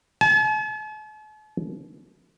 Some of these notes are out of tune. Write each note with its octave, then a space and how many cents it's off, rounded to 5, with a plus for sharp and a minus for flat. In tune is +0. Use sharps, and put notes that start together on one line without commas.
A5 -45